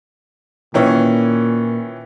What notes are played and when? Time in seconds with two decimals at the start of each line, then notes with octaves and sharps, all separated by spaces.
0.74 A#2 D#3 E3 C#4